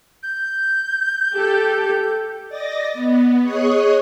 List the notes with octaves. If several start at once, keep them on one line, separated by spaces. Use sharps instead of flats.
G6
G4 A4
D5 D#5 A6 A#6
B3
G#4 C#5 D#5 C#6 D#6 F#6